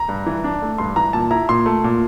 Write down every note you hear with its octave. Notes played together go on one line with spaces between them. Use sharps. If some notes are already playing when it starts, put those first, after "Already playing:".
Already playing: A#5
G2
E3
D4
A3
G2 C6
E3 A#5
A#2 A5
E4 A#5
A#2 C6
A3
A#2